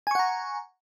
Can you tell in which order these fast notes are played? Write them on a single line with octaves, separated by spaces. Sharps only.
G#5 C#6 F#5 A#5